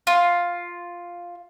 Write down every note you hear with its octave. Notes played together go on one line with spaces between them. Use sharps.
F4